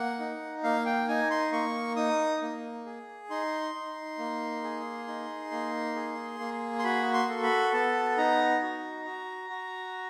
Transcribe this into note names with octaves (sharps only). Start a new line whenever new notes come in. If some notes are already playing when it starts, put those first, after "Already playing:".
Already playing: A#3 F#5
D#4
A#3 F5
G5
D#4 G#5
C6
A#3 C#6
D#4 D#6
A#3
G#4
D#4 C6
D#4
A#3
G#4
D#4
A#3
G#4
A#3
C6
F#4 B5
C6
A4
B5
B3 A5
D#4 A#5
F#4
F#4
F#4